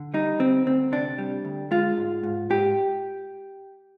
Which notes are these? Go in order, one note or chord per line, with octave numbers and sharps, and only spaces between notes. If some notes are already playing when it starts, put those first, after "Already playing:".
Already playing: D3
G3 D#4
D2 C4
D2 C4
C3 D4
G3
D2
G#3 F4
G#2
G#2
G#2 G4